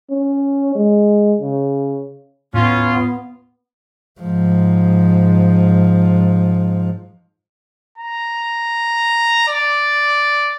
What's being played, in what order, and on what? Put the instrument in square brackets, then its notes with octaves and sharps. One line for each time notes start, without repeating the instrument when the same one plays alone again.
[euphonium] C#4
G#3
C#3
[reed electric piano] D#2 A2 [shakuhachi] B3 [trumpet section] C#4 F4
[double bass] G#2 F3
[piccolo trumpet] A#5
D5